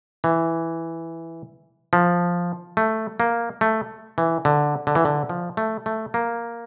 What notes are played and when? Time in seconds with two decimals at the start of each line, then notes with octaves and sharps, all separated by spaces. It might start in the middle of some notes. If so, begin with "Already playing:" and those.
0.24 E3
1.93 F3
2.77 A3
3.20 A#3
3.61 A3
4.18 E3
4.45 D3
4.87 D3
4.95 E3
5.05 D3
5.29 F3
5.57 A3
5.86 A3
6.14 A#3